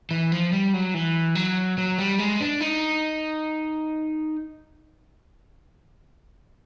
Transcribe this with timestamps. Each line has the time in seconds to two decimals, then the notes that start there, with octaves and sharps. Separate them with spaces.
0.11 E3
0.32 F3
0.53 G3
0.73 F#3
0.94 E3
1.35 F#3
1.78 F#3
1.98 G3
2.19 G#3
2.40 D4
2.61 D#4